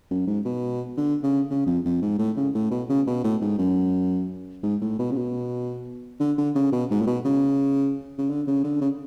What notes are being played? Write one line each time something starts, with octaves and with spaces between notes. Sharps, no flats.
F#2
G#2
B2
D3
C#3
C#3
F2
F2
G#2
A2
C#3
A2
B2
C#3
B2
A2
G#2
F#2
G#2
A2
B2
C#3
B2
D3
D3
C#3
B2
G#2
A2
B2
C#3
C#3
D3
C#3
D3
C#3